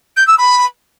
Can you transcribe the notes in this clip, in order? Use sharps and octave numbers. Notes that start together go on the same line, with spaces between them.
G6
E6
B5